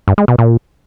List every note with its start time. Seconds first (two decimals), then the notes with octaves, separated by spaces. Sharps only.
0.08 G2
0.18 G#3
0.28 B2
0.38 A#2